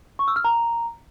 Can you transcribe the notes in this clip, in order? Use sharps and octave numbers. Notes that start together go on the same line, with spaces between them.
C#6
E6
F6
A#5